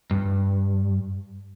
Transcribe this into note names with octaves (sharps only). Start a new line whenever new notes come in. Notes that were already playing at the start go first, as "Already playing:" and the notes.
G2